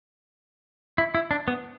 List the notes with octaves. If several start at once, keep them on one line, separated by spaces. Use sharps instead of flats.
E4
E4
D4
B3